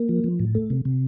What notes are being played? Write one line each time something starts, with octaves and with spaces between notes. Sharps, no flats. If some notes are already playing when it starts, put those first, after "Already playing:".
Already playing: A#3
F3
F3
A2
A3
C3
C3